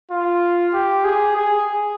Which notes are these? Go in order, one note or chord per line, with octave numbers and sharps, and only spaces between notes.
F4
G4
G#4
G#4